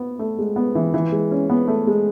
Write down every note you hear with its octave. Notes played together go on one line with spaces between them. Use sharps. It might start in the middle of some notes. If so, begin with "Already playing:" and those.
Already playing: B3
A3
G#3
B3
E3
E3
G#3
C#4
B3
A3
G#3